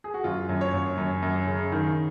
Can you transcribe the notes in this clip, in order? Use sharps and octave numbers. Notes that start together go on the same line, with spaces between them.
G#4
F#4
F#2 F4
F#2
C#5
F#2
F#2
F#2
C#3
D#3